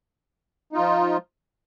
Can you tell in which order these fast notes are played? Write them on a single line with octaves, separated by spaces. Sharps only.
D#4 F4 F3